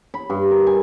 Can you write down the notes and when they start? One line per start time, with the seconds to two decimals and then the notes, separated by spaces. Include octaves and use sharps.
0.14 B5
0.30 G2
0.51 A#4
0.67 G#5